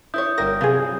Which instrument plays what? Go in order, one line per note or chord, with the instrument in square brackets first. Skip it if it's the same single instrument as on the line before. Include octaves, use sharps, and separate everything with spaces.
[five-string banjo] E4 C5 C#5 [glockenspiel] D#6 G6
[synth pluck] G1 A#6 [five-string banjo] G3 F#4 A#4
[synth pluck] C3 G#4 [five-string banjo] E3 F#3 F4